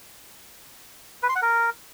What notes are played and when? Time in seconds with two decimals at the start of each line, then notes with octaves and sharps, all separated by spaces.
1.23 B4
1.29 C6
1.35 F#5
1.42 A#4